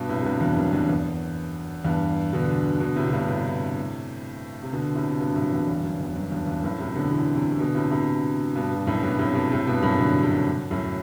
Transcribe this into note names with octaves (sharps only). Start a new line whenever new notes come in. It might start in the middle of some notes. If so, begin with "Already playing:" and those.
Already playing: G2 B2
A2 C3
C3
G2 B2
E2 G2
F#2
E2 G2
E2
E2 G2
B2 D3
B2 D3
A2 C3
C3
G2 B2
A2 C3
C3
B2 D3
A2 C3
C3
G2 B2
F#2 A2
E2 G2
E2 G2
F#2
E2
F#2
E2 G2
E2 G2
F#2 A2
A2 C3
B2 D3
C3 E3
C3 E3
C3
B2 D3
A2 C3
A2 C3
G2 B2
B2
F#2 A2
G2 B2
A2 C3
A2 C3
A2 C3
G2 B2
F#2 A2
B2 D3
A2 C3
F#2 A2